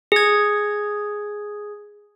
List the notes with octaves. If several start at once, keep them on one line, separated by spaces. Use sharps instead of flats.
G#4 G#6